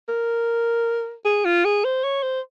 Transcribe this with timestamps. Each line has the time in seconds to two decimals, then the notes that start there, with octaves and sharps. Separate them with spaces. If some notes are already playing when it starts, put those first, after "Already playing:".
0.08 A#4
1.25 G#4
1.45 F4
1.64 G#4
1.84 C5
2.03 C#5
2.23 C5